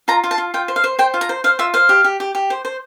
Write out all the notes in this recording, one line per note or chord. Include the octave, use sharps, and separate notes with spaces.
F4 A#5
F4
A5
F4
F4 G5
C5
F5
C5
C5 G5
F4
A#5
C5
C5 F5
F4 E5
C5 F5
G4
G4
G4
G4
C5
C5